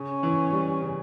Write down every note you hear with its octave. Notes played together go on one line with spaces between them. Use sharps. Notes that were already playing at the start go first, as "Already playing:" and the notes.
Already playing: C#3 C#4
E3
G3
C#3